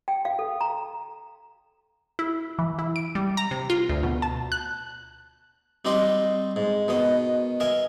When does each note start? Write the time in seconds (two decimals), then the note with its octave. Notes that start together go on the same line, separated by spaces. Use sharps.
0.08 G5
0.25 F5
0.39 A4
0.61 A#5
2.19 E4
2.59 E3
2.79 E4
2.96 D7
3.15 G3
3.37 A#5
3.51 C3
3.70 F4
3.89 D2
4.03 B2
4.22 A5
4.52 F#6
5.85 G3 C4 D#4 G4 D#5 C6
6.56 G#2
6.88 B2 D#3 D#5
7.60 A#4 D#5 E5 G#5